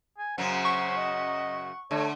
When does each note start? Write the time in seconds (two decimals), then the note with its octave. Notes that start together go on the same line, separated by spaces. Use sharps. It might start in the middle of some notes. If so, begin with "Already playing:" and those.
0.18 G#5
0.38 F#2 C#3 F#3 C5 F#5
0.65 C#6
0.97 D#5
1.91 D3 A3 C#5